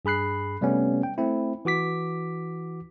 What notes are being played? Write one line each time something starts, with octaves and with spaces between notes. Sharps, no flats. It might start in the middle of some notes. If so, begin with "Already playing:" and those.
G2 G#4 B5 F#6 C7
C3 G3 A3 B3 C#4
G5
A3 C4 E4
E3 F#4 D6 B6